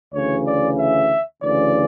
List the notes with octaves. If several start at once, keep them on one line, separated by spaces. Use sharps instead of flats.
D2 C#3 E3 C#5
D5
E5
D2 C#3 E3 D5